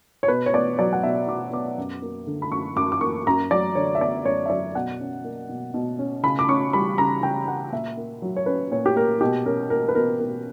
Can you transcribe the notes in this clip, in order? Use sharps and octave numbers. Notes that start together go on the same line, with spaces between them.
C#5
B2 B4
C#5
B3 D5
F#3 D5
F#5
B2 E5
B2 D6
B3 D6
F#2
A#3
D3
B5
F#2 C#6
F#2 D6
D6
A#3 C#6
F#2 A#5
F#3 D5
D3 C#5
E5
B3 D5
F#2 C#5
E5
F#3 D5
B2 F#5
C#4
A#3
B2
B2
C#4
C#3 B5
D6
C#4 C#6
G3 B5
C#3 A#5
C#3 G5
C#4 F#5
A#2 E5
A#3
F#3
C#5
C#4 B4
A#2 C#5
G4
A#3 A#4
B2 G4
C#4 A#4
A#3 A#4
B4
B2 A#4
B2 A#4